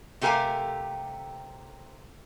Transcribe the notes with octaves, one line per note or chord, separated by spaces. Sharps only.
C3 A3 G4 A#4 F5 G#5